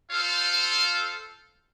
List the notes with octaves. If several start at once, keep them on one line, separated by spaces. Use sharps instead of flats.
F4 A4 C5 F5